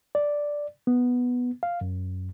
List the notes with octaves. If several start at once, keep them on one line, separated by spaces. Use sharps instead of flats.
D5
B3
F5
F#2